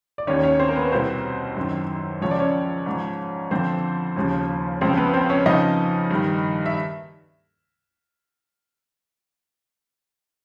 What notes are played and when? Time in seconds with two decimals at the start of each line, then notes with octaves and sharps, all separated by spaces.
0.18 D5
0.27 D#2 D#3 C#4 C#5
0.43 C#4 C#5
0.60 C4 C5
0.69 A#4
0.76 B3 B4
0.92 C2 B2 C4 C5
1.56 F#2 D#3
2.21 C#2 C#3 F3 C#5
2.31 D5
2.40 C#4 C#5
2.86 G#2 F3
3.51 F2 D3 F3 C4 C5
4.16 D#2 C#3 F3
4.81 C#2 C#3 F3 C4 C5
4.97 B3 B4
5.14 C4 C5
5.30 C#4 C#5
5.46 F2 C#3 F3 D#4 D#5
6.10 G2 D#3
6.66 E5